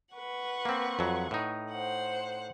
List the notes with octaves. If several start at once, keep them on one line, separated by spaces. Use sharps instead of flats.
B4 F#5 C#6
A#3 C4
F2 F#3
A2 D#4
C5 F#5